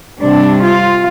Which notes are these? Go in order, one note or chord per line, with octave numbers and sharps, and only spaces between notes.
C3 G3 D4
F4